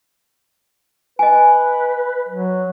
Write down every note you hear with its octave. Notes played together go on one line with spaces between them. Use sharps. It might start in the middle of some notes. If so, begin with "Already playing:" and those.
B4 D#5 G#5
F#3